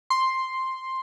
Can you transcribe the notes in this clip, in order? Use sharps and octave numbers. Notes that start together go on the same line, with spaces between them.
C6